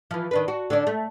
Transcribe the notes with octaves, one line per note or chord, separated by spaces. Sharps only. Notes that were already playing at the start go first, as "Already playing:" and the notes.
E3 F3
D#3 D4 B4
F#4
D3 C#4 D4
A3